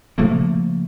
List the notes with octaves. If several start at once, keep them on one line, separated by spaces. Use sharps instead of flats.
C#3 F3 A3 A#3